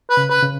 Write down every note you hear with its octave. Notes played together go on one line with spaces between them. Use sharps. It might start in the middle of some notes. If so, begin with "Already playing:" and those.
B4
C#3
B4
C#3